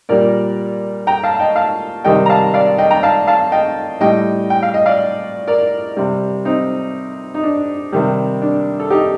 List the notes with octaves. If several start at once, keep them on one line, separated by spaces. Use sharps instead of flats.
A#2 G3 A#4 D5
G5 A#5
F5 A5
A5
D#5 G5
F5 A5
C3 D#3 G3 D#5 G5
A#5
F5 A5
D5 F5
D#5 G5
G5 A#5
F5 A5
F5 A5
D#5 G5
A2 G3 D#5 G5
G5
F5
D#5
D5 F5
A#4 D5
C3 G3
C4 D#4
D#4
D4
C3 D#3 G3
D4
A4
D#4 G4